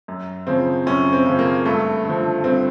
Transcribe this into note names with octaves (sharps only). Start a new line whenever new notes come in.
F#2
C#3 F3 C4
F#2 C#4
C4
C#3 F3
A#3
G2 A3
D3 F3
G2 C4